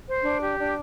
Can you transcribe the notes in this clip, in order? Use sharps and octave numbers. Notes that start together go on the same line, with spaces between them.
C5
D4
G4
D4